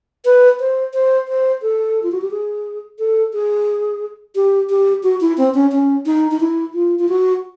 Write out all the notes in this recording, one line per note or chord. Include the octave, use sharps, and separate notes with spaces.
B4
C5
C5
C5
A4
F4
F#4
G4
G#4
A4
G#4
G4
G4
F#4
E4
C4
C#4
C#4
D#4
D#4
E4
F4
F4
F#4